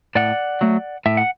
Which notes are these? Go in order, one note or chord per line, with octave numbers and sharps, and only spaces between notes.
A2 D5 F#5
F#3 A3
A2 E5
F#5